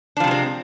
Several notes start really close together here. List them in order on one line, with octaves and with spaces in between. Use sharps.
D4 F3 C3 G#3 C4